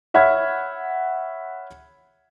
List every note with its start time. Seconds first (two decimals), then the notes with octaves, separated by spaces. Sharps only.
0.14 C#5 E5 F#5 B5 F6 G#6